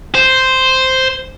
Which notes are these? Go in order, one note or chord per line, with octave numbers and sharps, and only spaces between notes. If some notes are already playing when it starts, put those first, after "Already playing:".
C5